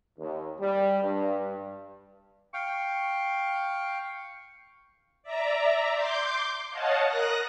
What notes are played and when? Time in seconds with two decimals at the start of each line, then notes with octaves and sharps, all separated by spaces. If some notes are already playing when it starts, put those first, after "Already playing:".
0.19 D#2
0.60 G3
1.03 G2
2.54 F5 G5 C#6
5.23 D5 E5 A#5
5.93 C6 D6 G6
6.70 C#5 D#5 F5 F#5 A5
7.06 A#4 D#6 F#6 A#6